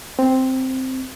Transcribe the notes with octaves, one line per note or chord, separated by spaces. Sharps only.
C4